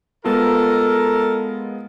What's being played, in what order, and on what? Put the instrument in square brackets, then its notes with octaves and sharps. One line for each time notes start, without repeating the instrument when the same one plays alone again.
[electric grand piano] G#3 B3 F4 [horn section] A4 A#4